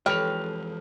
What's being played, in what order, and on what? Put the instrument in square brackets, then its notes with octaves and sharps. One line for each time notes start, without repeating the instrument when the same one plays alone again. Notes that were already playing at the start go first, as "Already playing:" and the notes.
[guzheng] F2 [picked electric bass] E3 G#3 [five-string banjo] G4 B4 C#5 [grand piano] F6 F7